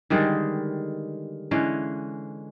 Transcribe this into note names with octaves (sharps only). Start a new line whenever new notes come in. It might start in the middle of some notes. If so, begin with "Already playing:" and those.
D3 D#3 G3 G#3
D3 E3 G#3 C#4